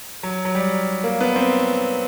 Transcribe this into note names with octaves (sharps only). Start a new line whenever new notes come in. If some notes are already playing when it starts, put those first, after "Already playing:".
F#3
F#3
G3
A#3
B3
C4